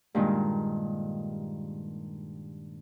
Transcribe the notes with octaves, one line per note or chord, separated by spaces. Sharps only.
G2 A#2 D#3 G#3